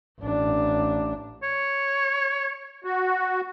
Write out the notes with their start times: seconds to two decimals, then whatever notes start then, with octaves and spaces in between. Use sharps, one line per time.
0.20 A1 D4
1.43 C#5
2.84 F#4